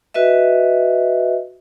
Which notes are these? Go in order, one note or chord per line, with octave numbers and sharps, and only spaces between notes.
F#4 B4 D#5 E5